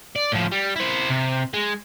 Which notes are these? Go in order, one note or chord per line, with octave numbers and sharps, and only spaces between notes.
D5
A2 F3
G3
E4 C5
C3
G#3